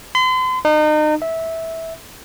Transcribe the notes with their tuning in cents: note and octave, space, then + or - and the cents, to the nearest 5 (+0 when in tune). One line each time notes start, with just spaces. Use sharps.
C6 -40
D#4 -35
E5 -15